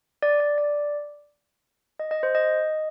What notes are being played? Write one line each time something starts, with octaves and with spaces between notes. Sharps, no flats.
D5
D5
D5
D#5
D#5
C5
D#5